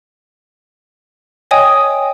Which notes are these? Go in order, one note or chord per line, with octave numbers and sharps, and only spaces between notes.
C#5 D#5 G5 G#5 D#6